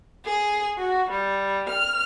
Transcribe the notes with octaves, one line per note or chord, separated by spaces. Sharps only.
G#4
F#4
G3
F6